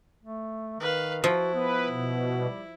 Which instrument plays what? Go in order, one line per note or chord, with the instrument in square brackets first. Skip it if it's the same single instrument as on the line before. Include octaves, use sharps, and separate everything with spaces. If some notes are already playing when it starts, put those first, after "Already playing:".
[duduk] A3
[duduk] D#3 [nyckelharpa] B4 F5
[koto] F3 [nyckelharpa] E4 [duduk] F#4
[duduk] B3 [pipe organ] B4
[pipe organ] B2
[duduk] G3